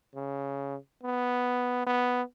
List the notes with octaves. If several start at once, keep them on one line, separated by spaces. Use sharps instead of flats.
C#3
B3
B3